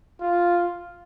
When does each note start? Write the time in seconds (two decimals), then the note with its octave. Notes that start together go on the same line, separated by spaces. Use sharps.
0.21 F4